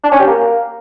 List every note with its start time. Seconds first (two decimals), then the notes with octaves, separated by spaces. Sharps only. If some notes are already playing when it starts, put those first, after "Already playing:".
0.04 D4
0.11 C#4
0.19 G4
0.27 A#3